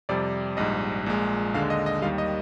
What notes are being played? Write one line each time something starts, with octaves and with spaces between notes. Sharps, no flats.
F2 C3 G3 D5
A#1 G#2 G3 D#5
A#1 A#2 G#3
D#2 D3 G#3 F5
D#5
D#5
D#2 D#3 G3 F5
D#5